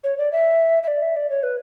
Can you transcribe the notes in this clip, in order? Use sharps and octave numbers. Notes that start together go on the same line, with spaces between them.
C#5
D5
E5
E5
D5
E5
D5
C#5
B4